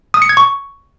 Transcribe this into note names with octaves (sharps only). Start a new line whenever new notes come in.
D#6
C#7
G#6
C#6